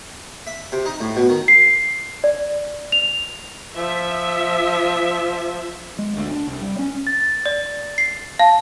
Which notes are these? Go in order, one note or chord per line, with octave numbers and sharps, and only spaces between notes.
E5
C3
D#4
A2
B2
D#3
C7
D5
F7
F3 E5
G#3
D2
D4
C2
G3
C#4
A6
D5
C7
F5 A5